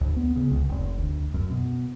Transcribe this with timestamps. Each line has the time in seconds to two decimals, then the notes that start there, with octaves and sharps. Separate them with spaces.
0.01 D2
0.16 B3
0.36 C#3
0.51 C#2
0.69 F1
0.97 D2
1.34 F#2
1.51 B2